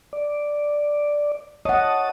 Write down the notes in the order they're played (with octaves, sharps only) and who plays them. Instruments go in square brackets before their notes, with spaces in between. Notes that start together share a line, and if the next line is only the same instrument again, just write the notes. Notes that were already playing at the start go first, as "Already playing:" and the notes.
[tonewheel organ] D5
[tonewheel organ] C#5 A5 D#6 [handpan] D#5 F#5